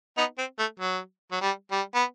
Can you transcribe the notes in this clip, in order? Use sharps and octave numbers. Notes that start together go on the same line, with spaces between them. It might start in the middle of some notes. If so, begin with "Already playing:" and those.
B3 D#4
C4
A3
F#3
F#3
G3
G3
B3